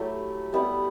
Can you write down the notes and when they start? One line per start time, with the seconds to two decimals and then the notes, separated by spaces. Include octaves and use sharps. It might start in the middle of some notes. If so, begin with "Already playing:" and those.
Already playing: F#3 A3 E4 G4
0.53 G3 B3 E4 B4